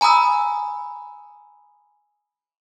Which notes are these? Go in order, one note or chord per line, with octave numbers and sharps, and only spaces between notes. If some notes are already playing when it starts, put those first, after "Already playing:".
G#5 A#5 B5 D#6 E6